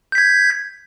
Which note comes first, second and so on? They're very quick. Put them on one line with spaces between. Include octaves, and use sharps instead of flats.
G6 B6 G#6